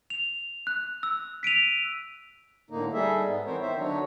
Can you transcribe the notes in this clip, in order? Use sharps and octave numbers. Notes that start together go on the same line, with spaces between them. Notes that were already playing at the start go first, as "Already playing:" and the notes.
F7
F#6
E6
B6 D7 D#7 F7
A2 D3 A#3 D#4
G3 D#4 G#4 A4 E5
G#2 B3
E3 B3 C4 A#4 C5 C#5
D#3 D#4 C5 E5
D3 F#3 D4 D#4 C#5